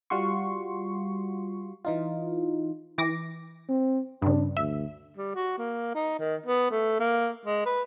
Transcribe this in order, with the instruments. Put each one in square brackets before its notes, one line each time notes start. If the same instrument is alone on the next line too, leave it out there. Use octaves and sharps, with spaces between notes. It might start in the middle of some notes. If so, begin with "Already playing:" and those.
[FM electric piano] G3 F4 F#4 C6 C#6
E3 D#4 F4
[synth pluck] E3 D6 A#6
[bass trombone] C4
[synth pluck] G2 C#3 [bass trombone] D4
[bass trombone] D2 [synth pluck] E5
[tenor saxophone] G3
F#4
A#3
D#4
D#3
B3
A3
A#3
G#3
B4